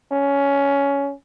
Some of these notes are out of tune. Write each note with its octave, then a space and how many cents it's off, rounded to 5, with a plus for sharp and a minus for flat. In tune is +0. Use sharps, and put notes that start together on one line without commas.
C#4 +15